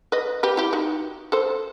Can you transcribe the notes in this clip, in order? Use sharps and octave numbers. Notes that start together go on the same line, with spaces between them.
B4 D#5
G4 B4
E4 G4
D#4 F#4
A4 C5